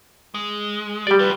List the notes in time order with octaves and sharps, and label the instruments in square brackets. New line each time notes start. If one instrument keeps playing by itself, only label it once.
[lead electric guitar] G#3
[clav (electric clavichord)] G3 D5 [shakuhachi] G4
[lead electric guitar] F4 G4 [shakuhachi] B4